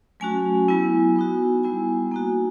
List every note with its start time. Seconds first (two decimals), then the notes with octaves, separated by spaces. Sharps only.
0.20 F#3 A3 C#4 F#4 G#5
0.68 F#3 B3 E4
1.16 B3 D#4 F#4
1.63 G3 B3 E4 G#5
2.11 A#3 D#4 F#4